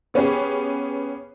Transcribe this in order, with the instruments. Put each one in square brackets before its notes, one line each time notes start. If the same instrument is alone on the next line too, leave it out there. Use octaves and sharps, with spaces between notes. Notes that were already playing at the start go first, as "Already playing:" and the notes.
[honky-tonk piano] C#3 B3 C#4 G4 G#4